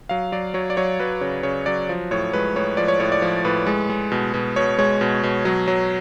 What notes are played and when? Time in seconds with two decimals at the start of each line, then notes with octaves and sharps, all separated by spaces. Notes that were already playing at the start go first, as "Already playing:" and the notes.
0.09 F#3 F5
0.32 F#3 D5
0.54 F#3 C#5
0.70 D5
0.77 F#3 C#5
1.00 F#3 B4
1.21 C#3 C#5
1.43 C#3 C#5
1.66 F#3 D5
1.89 F3
2.11 A2 C#5
2.33 G#3 B4
2.56 A2 C#5
2.77 F3 D5
2.88 C#5
3.00 A2 C#5
3.12 D5
3.22 F3
3.45 A2 B4
3.67 G#3
3.89 G#3
4.12 B2
4.34 B2
4.56 B2 C#5
4.78 G#3 C#5
5.01 B2
5.23 B2
5.45 F#3
5.68 F#3